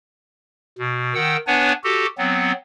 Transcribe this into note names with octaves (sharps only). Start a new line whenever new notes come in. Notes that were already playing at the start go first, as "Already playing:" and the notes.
B2
D#3 F#5 G5 E6
B3 D4 B4 C#5 F#5 G#5
F#4 G4 A4
F#3 B3 C4